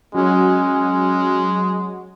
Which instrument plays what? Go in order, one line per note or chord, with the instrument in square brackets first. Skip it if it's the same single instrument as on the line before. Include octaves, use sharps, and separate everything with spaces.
[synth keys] F#3 F#4 [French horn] G#3 [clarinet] C#4